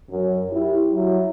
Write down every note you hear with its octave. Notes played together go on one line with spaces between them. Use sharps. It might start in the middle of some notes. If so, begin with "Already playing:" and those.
F#2
E4 G4
F#3 E4